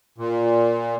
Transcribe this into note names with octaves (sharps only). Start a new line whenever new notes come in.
A#2